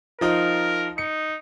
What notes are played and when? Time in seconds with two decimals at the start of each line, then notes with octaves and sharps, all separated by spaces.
0.21 F3 D#4 F4 A#4
0.98 D#4 C#7